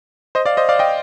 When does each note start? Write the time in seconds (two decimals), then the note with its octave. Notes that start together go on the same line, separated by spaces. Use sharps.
0.35 C5 D#5
0.46 D5 F5
0.57 C5 D#5
0.69 D5 F5
0.79 D#5 G5